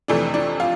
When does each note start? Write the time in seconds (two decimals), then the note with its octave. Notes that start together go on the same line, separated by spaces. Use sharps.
0.08 F2 C3 E3 A3 D4
0.34 D4
0.60 F4